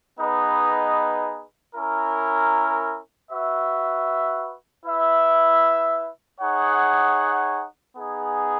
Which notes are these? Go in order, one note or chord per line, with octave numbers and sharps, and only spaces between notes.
B3 D#4 G#4 B4 D#5
C#4 E4 A#4
F#4 B4 E5
E4 B4 E5
D#4 G#4 C#5 F#5
B3 D#4 G#4